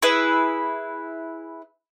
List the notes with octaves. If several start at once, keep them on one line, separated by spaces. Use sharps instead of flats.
E4 G#4 B4